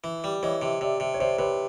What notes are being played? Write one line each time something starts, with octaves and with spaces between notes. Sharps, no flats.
E3
G3
E3 C#5 D#5
C3
C3 D5 E5
C3
C#5
C3 C5 D5
C5
C3 B4 C#5